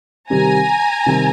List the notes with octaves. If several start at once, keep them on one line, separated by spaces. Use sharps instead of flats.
C3 D#3 G3 C4 G#5 A#5
C3 D#3 G3 C4